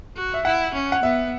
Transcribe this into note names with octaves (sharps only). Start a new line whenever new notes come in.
F#4
E5
E4 F#5
C#4
F#5
B3 E5